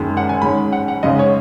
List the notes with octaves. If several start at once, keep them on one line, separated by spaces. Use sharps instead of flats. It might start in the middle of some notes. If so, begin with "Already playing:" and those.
Already playing: F#1 F#2 D#3 G#3
F#5
G#5
G#2 G#3 C#4 B5
F#5
F#5
G#1 F#2 C#3 G#3 C#4 D#5
C#5